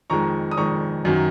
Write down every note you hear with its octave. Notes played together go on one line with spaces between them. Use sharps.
F2 D#3 G#3 A#5 C#6
D#6
F2 D#3 G#3 A#5 C#6
F#2 D#3 F#3